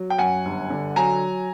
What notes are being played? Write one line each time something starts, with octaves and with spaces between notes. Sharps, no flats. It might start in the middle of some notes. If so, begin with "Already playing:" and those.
Already playing: F#3
G5
F#2 F#5 G#5
G1
D3
F#3 G#5 A#5